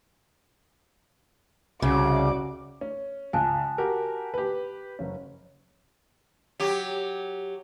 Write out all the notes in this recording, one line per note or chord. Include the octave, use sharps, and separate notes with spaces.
C2 C#3 C#4 F#4 D6
C#4
C#2 G#5 A5 F#6
F#4 G4 A#4
G4 B4
F#1 C#4
F#3 G4